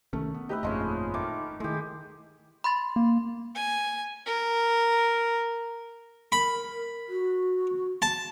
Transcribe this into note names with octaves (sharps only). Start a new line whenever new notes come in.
C2 D#3 A3 C#4
B3
A3 D#4 G4 B4 D#5 E5
G1 F2 A#2 F3 G#3 C#4 D#5
D#3 A3 D#4 D6
D#3 G#3 A3 E4 G4
B5 C6 A6
A#3
G#5
A#4
A#4 B5
F#4
A5